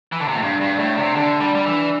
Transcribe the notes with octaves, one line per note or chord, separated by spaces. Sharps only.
E3
D3
C3
A2
G2 D4
G2
D5
A2
D5
C3
D3 D4
G3 D5
G3
E3 D4